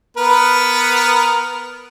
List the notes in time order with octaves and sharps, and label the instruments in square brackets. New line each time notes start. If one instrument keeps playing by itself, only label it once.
[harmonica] B3 A#4 B4